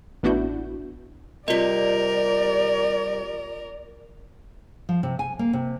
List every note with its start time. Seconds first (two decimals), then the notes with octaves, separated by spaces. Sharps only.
0.23 A1 B3 D4 E4 F#4 G6
1.48 C3 G3 F4 A#4 D5 D#5
4.89 F3
5.03 C3
5.19 G#5
5.39 A#3
5.53 C3